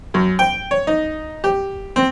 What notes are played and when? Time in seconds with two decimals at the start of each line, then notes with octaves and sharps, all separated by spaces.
0.14 F#2
0.39 G5
0.71 C#5
0.87 D#4
1.44 G4
1.96 C4